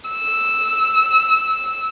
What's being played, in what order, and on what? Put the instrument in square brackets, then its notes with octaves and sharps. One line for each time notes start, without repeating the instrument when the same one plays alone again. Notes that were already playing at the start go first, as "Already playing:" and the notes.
[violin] E6